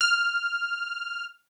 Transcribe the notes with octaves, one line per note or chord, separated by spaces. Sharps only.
F6